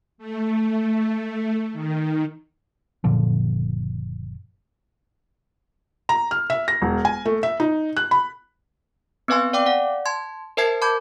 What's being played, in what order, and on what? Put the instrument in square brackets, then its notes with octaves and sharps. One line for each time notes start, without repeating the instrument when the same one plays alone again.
[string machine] A3
D#3
[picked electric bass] F#1 A#2 D3 F3
[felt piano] A#5
F6
E5
A#6
E1
G#5
A3
E5
D#4
F#6
B5
[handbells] B3 C4 B4 F5 G#5 C6
D5 F5 G5 D6
D5 F#5
A5 C6 G#6
A#4 C5 E5 A5 G#6 C7
A5 B5 D6 G6 G#6